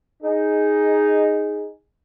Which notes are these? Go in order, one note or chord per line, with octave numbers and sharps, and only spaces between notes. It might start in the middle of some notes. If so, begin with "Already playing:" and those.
D#4 G#4